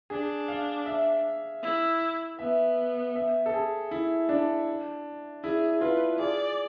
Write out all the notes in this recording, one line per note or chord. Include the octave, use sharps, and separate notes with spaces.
D4 G#4
F5
E5
E4
B3 E5
E5
A4
G#4
E4
D4
E4 G#4
F4 B4
G#4 D5